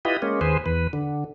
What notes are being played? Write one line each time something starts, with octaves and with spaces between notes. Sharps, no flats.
E4 F4 G4 B4 D#5
G#3 A#3 C#4
D#2 G#4 B4 C5
E2 B4
D3